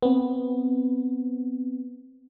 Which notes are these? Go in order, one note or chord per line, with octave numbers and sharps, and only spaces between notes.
B3 C4